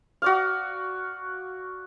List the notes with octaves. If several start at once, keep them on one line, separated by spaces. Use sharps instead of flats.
F#4 D5 F5